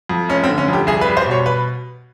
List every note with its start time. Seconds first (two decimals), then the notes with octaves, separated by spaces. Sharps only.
0.09 F2
0.29 F1 C#4
0.43 C4
0.49 D3
0.58 C#4
0.68 F2 G4
0.87 C2 G#4
1.01 B4
1.07 G3
1.17 C5
1.26 B2 C#5
1.46 B4